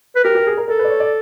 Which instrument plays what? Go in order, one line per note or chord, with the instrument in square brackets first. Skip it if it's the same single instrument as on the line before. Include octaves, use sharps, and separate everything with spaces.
[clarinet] B4
[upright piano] G4 [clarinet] A#4
[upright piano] G4
G#4
A#4
[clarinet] A4 [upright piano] A#4
[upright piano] B4
D5
C#5
D5